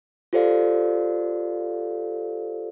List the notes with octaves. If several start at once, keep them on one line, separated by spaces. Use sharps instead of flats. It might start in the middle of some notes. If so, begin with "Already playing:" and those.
F4 G4 A4 C5 D5 F5